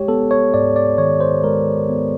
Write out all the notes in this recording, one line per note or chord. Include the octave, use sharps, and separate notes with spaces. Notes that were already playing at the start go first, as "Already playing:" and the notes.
Already playing: G#3 G4 C#5
B3 A4
C#5
G#2 D5
D5
D#3 C#5
C5
G#3 A#4
B3